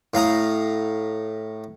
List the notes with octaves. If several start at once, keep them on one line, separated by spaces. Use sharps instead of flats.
A2 F5 A#5 D#6